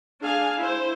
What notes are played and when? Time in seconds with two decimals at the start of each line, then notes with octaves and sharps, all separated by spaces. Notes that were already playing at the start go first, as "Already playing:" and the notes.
0.21 D4 G#4 F5 G#5
0.60 E4 C5